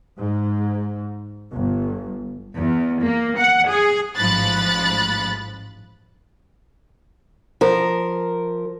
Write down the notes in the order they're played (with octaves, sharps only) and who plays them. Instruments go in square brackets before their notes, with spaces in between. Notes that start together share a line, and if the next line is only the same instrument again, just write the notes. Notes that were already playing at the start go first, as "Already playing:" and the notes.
[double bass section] G#2
G1
[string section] E2
A#3
F#5
G#4
A1 G#2 F3 B5 F#6 A6
[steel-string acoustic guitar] F3 A#4